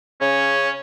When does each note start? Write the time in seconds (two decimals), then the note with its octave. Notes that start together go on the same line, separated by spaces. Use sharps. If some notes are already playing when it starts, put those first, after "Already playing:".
0.21 C#3 C#4